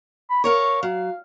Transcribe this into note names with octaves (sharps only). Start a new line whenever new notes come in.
B5
A#4 C#5 F5 C#6
F#3 F5